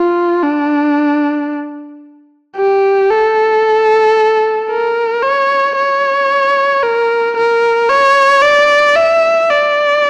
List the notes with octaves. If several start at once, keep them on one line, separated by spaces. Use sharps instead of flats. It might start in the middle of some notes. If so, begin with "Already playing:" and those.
Already playing: F4
D4
G4
A4
A#4
C#5
C#5
A#4
A#4
C#5
D5
E5
D5